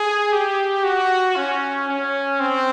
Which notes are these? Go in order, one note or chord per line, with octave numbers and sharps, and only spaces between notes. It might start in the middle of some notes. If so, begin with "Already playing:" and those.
Already playing: G#4
G4
F#4
C#4
C#4
C4